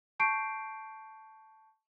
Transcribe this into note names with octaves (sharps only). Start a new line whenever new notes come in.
A5 C#6 G6 C7 D7